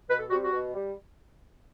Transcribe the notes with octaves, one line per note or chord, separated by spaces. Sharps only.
B2 B4
A4
G3 C4 F#4
F#4
B2
G3